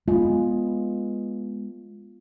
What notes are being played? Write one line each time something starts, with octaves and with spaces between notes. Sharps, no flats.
G#3 A3 B3 F4